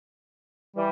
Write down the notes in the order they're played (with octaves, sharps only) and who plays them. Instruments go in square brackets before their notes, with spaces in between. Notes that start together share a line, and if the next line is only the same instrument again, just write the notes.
[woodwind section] E3 G3